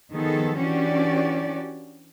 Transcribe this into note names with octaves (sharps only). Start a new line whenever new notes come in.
D#3 F3 B3 G#4 A4
E3 C#4 D4 F#4 G4 D5